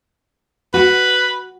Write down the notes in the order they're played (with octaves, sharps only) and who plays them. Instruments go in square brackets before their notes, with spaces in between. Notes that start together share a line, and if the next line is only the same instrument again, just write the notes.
[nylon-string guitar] F#4 [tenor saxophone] B4